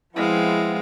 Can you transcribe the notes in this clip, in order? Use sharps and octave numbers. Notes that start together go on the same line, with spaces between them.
F3 G#3 B3 C4 E4 F5